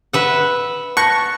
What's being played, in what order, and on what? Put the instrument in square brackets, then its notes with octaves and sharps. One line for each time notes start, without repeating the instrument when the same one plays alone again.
[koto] B4 E5 F#5
[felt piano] A5 F#6 A#6 [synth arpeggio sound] C#6